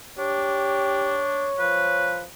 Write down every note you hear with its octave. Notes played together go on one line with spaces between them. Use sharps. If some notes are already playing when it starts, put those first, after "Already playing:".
D4 G4 C#5
F3 B4